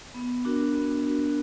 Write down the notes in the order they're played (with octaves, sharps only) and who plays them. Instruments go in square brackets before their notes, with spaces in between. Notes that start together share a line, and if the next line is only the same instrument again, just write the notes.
[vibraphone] B3
D4 F#4 A#4
B3
D4 F#4 A#4